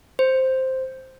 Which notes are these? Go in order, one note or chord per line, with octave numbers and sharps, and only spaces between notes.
C5